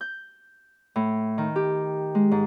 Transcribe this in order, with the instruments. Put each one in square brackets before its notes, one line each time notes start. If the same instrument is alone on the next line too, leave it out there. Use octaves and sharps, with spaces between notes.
[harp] G6
A2
D#3
G4
G#3
G#2